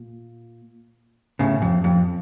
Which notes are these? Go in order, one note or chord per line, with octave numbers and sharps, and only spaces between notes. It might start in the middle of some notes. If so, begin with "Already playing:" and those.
Already playing: A#2
A2 C#3
F2
F2